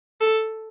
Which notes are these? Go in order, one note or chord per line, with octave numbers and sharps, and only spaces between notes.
A4